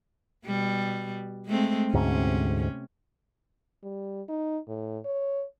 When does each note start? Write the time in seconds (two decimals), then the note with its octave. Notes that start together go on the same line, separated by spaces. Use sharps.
0.46 B2 G3
1.46 G#3 A3 C4
1.94 D2 G#2 C3 C#4
3.83 G3
4.29 D#4
4.68 A2
5.05 C#5